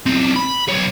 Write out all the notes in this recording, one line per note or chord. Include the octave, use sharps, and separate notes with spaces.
B1 C4
B5
B1 C#5